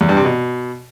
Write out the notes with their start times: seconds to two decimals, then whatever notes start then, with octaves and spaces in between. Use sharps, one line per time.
0.01 E2
0.09 G2
0.17 C3
0.25 B2